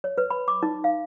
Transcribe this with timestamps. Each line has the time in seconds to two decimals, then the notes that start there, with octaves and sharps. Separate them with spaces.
0.04 C#5
0.18 B4
0.30 B5
0.48 D6
0.63 D#4
0.84 F5